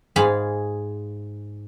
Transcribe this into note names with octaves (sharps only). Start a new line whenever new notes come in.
G#2 G#4 F5 B5